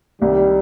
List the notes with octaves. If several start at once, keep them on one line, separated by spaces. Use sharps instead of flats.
C2 D#3 G3